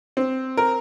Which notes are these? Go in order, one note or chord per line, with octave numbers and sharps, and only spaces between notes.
C4
A#4